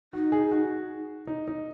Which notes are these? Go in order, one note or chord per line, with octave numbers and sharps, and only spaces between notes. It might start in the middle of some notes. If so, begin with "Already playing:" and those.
D#4 F#4
G#4
F#4
D#4
D#4